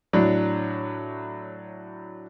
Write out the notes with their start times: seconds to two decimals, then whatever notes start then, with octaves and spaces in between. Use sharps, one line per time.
0.13 A2 F#3 D4